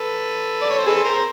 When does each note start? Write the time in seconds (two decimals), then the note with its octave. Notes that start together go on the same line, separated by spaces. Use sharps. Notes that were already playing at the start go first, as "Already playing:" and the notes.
Already playing: A4 B4
0.62 D5
0.70 C#5
0.78 C5
0.86 C4 D#4 G#4 A4 B4
1.04 A#4 C5
1.14 C5